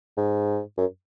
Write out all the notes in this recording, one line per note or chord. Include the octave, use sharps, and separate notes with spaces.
G#2
F#2